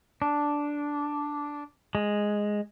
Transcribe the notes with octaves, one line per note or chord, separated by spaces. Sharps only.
D4
G#3